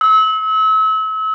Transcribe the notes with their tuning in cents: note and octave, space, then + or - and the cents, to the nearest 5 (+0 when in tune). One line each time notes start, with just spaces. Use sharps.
E6 -35